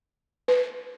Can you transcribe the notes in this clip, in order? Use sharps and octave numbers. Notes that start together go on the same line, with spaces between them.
B4